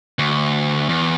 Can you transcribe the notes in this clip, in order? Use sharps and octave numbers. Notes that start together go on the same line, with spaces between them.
D2
E2